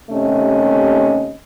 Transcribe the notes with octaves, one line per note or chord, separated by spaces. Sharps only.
D#2 C3 A3 C#4 D#5